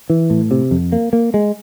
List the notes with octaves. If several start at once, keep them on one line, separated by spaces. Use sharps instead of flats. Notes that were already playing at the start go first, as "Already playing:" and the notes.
E3
A2
C3
F2
A#3
A#3
G#3